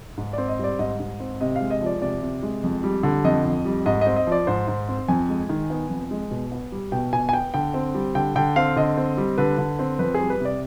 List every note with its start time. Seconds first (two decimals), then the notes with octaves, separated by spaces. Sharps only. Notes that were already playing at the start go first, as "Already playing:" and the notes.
0.17 G#2
0.33 C4 D5
0.48 D#5
0.59 G3 D5
0.79 G#2 D#5
1.00 G#2
1.20 C4
1.41 C3 D#5
1.56 F5
1.61 G#3
1.70 D#5
1.81 F3
1.86 D5
2.01 C3 D5
2.22 C3
2.43 G#3
2.63 F2
2.84 G3
3.03 D3
3.24 F2 D#5
3.45 F2
3.65 G3
3.86 G#2 D#5
4.01 C4 D#5
4.16 D#5
4.27 F3 D5
4.47 G#2 C5
4.68 G#2
4.88 C4
5.08 F2 G#5
5.29 G#3
5.49 D#3
5.70 B3
5.90 F2
6.11 G#3
6.31 B2
6.52 B3
6.72 G3
6.92 B2 G5
7.13 B2 G#5
7.29 G#5
7.33 B3 G5
7.54 D3 G5
7.74 C4
7.95 G3
8.15 D3 G5
8.36 D3 G5
8.56 C4 F5
8.76 D3 D#5
8.97 C4
9.17 G3
9.38 D3 B4
9.58 D3
9.79 C4
9.99 F2 B4
10.14 G#4
10.20 G3
10.30 B4
10.40 C3
10.45 D5